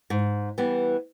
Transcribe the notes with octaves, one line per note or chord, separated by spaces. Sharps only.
G#2
E3 G3 B3